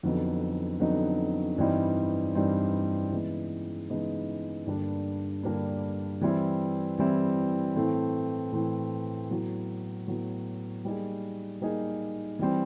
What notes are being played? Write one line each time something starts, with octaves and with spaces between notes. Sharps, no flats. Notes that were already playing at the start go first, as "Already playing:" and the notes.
F2 D3 F#3 B3 D#4
F2 D3 F#3 B3 D#4
G2 E3 G3 C4 D#4
G2 E3 G3 C4 D#4
C#3 E3 G#3 B3 D#4
C#3 E3 G#3 B3 D#4
G2 D3 G3 A#3 D4
G2 D3 G3 A#3 D4
E3 G3 C4 E4
E3 G3 C4 E4
A2 E3 A3 C4
A2 E3 A3 C4
A2 F#3 B3
A2 F#3 B3
G3 A#3 D#4 G#4
G3 A#3 D#4 G#4
E3 G3 C4